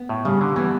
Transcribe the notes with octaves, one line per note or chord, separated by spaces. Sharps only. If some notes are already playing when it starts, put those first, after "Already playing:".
Already playing: B3
A2
C#3 G3
D3
E3 B3